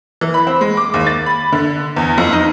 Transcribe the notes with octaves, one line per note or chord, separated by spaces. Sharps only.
E3
B5
C4
G#3
D6
D#2
A6
B5
D3
E2
F2
D#4